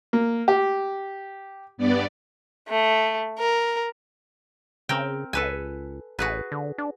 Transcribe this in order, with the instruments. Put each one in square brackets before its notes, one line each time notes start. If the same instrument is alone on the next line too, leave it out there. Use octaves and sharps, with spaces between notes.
[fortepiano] A#3
G4
[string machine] G2 B3 D5
[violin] A3
A#4
[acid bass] C#3 [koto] C4 A#4 G5
[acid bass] C#2 [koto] A4 B4 G#5
[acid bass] A1 [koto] F#4 G#4 B4
[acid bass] D3
D4